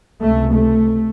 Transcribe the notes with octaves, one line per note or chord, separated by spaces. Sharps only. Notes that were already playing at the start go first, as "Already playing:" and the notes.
C#2 C3 A3
A3